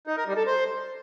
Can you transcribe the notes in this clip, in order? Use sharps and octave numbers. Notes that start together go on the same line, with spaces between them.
D#4
A#4
G3
A4
C5